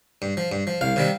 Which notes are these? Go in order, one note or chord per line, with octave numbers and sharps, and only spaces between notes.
G2
F3
G2
F3
C2 F5
C3 D#3 G3